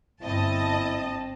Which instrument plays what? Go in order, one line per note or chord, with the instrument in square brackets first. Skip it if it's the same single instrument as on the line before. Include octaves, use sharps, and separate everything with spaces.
[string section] G1 D#5 [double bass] C4 [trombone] E4 [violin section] A5